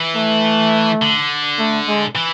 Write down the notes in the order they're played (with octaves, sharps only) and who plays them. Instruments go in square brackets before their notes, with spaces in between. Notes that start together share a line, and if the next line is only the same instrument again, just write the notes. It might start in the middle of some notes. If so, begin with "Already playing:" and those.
Already playing: [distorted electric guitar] E3
[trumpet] A3
[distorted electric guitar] D3
[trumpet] A3
G#3
[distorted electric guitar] E3